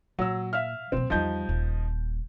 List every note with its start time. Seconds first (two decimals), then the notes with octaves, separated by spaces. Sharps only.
0.19 A#2 F#3 E6
0.53 E5 F5 F6
0.92 B1 A#3 C4
1.10 E2 F3 G3 D#4 G6
1.49 D#1